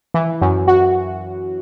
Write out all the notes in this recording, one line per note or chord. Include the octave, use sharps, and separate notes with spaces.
E3
F#2
F#4